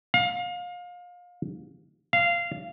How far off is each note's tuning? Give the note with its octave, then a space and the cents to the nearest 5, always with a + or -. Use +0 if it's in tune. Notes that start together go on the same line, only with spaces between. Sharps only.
F5 +30
F5 -15